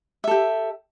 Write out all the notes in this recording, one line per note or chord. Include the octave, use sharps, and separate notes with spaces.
G4 A4 E5